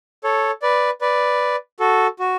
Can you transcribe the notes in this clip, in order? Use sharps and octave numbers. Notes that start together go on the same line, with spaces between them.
A4 C#5
B4 D5
B4 D5
F#4 A4
F#4